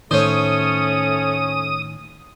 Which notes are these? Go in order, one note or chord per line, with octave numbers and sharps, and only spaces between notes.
A2 D#3 A3 C#4 C5 C#5 D#6